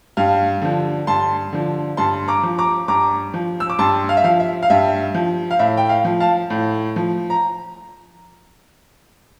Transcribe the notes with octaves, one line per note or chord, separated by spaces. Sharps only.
G2 F5
D3 F3
G2 A5 C6
D3 F3
G2 A5 C6
A#5 D6
F3
A#5 D6
G2 A#5 D6
F3
E6
D6
G2 A5 C6
F5
E5
F3 F5
E5
F5
G2 E5
F3
F5
A2 E5
G5
F5
F3
F5 A5
A2
F3
A#5